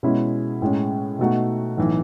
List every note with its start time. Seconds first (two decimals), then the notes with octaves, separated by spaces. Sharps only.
0.03 B2 G#3 C#4 E4
0.62 A2 G#3 C#4
1.19 B2 A3 D#4 F#4
1.77 B1 A2 E3